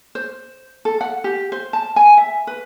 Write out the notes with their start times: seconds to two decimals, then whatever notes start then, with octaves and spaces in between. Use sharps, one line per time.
0.15 C5
0.85 A4
1.01 F#5
1.24 G4
1.52 C5
1.73 A5
1.96 G#5
2.17 E5
2.47 B4